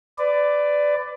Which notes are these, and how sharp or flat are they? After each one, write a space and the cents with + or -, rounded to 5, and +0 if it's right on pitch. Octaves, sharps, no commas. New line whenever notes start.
B4 +30 D5 +0